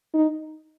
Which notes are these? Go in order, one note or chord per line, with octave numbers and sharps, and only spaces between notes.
D#4